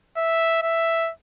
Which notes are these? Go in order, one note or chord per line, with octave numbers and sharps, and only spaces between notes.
E5
E5